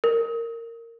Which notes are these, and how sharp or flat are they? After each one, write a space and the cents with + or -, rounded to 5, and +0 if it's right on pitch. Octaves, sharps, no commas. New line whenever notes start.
A#4 -15